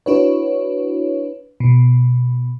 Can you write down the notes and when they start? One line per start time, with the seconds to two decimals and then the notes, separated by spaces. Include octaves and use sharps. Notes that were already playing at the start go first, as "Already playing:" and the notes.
0.06 D4 E4 F#4 B4 C#5
1.60 B2